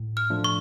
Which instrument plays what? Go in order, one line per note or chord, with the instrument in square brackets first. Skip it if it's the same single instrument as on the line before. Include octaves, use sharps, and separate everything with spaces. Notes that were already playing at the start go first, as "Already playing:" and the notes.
Already playing: [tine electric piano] A2
[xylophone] F6
[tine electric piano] F3 A3 D4 F4
[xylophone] C#6